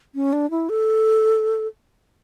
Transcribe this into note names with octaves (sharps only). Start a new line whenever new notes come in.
C#4
D4
E4
A4